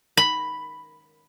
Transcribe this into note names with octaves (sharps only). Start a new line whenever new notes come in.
B5